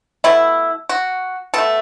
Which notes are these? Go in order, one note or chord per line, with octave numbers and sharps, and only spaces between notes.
B2 A3 E4
F#4
B2 A3 A4